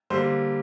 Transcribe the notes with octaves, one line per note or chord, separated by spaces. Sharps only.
D3 G3 A#3 C5